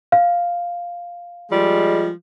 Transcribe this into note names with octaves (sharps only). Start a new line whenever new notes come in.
F5
F3 G3 G#3